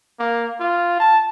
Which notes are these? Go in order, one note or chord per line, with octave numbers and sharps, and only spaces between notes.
A#3
F4
A5